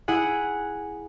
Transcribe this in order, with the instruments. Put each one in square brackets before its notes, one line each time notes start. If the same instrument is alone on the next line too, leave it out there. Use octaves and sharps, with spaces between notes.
[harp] E4 G#4 F#5